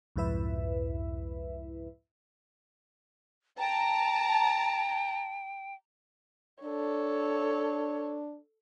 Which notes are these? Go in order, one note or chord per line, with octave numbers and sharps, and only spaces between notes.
C2 F2 G#2 E4 B4 E5
G5 A5 A#5
D4 A4 C#5